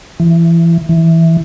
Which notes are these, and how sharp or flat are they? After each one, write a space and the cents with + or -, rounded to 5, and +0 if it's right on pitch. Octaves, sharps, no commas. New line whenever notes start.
E3 +25
E3 -5